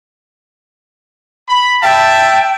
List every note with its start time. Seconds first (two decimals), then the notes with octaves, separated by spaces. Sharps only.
1.49 B5
1.83 E5 G5 A5